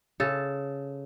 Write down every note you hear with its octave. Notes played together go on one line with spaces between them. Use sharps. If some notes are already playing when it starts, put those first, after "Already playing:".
C#3 A4